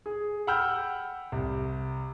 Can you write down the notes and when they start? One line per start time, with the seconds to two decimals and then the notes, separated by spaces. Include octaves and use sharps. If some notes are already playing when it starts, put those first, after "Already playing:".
0.06 G#4
0.47 F#5 G5 B5 E6 F6 G6
1.32 C2